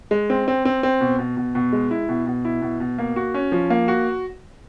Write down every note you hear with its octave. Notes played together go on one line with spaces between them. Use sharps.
G#3
C4
C4
C4
C4
B2
B2
B2
B2
G#3
E4
B2
B2
E4
B2
B2
A#3
F#4
C#4
F3
A#3
F#4